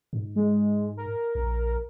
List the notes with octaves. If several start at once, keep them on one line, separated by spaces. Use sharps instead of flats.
G#2
G#3
A#4
A#1